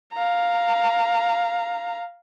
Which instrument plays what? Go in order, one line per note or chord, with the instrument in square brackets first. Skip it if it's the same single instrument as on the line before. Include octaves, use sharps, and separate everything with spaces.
[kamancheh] F5 A#5